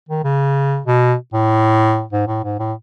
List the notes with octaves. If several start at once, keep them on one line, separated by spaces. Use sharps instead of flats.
D#3
C#3
B2
A2
G#2
A2
G#2
A2